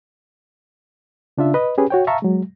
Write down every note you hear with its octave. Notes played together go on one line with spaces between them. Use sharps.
C#3 D4 F4 E5
B4 D#5
C#4 G4 G#4 B4
F#4 C#5 G5
E5 F5 A5 A#5 C#6
F#3 G#3